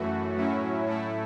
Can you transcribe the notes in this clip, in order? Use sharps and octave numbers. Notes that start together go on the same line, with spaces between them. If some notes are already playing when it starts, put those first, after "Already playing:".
Already playing: F#2 E3 A3 F#4
A2 F#3 C#4 E4
A2 A3 E4